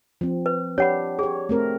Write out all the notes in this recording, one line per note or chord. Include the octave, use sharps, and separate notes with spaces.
F3 C4
B4
D4 G4 C#5 F#5 B5
G4 G#4 C#5
A3 C4 A#4